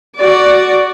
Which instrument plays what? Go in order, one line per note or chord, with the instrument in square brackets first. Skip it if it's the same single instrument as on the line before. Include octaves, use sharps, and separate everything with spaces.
[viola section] F#4 D5